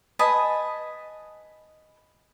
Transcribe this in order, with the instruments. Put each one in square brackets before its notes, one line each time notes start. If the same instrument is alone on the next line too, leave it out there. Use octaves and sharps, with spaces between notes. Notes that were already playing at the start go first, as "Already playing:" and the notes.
[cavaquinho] B4 D#5 G#5 A5